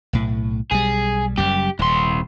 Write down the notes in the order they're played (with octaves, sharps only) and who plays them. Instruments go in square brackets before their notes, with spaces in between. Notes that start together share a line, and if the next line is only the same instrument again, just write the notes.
[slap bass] B1 A2
[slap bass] B1 G3 [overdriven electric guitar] G#4
[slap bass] F#1 F#2 G3 [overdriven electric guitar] G4
[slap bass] D#1 [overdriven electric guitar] C2 C6